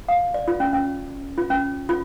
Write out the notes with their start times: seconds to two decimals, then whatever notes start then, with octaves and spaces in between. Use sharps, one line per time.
0.09 F5
0.34 D5
0.48 F4
0.60 C#4
0.73 C#4
1.38 F4
1.50 C#4
1.89 F4